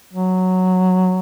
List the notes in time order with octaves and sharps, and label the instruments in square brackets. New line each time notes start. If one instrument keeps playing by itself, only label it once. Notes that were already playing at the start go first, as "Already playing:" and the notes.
[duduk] F#3